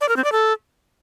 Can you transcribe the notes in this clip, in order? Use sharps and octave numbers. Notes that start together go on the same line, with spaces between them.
D5
A#4
C4
D5
A4